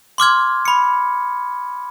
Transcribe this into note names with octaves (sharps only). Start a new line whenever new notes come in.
C6 D6 F6 G#6
B5 C#7